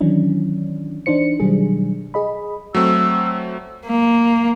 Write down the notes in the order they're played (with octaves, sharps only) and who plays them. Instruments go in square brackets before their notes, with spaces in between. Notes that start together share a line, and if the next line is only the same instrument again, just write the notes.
[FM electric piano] D#3 E3 F#3 C#4 D4
E3 D4 D#4 C5 C#7
B2 D#3 F#3 G3 D4 G#4
G#4 D#5 B5
[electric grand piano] F#3 A3 C4 [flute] E6
[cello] A#3